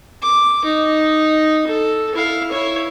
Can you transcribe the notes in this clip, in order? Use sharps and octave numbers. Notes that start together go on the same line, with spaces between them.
D6
D#4
A4
E4 F5
E4 C#5